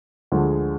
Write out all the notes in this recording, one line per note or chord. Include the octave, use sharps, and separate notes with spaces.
D2 D3 F3 G#3